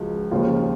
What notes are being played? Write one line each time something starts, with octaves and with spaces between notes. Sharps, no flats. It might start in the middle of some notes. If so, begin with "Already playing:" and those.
Already playing: C#2 F3 F#4
D#2 C#3 F3 F4